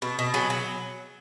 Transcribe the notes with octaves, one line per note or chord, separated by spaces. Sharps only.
B2
B2
F#3 G#4
F#3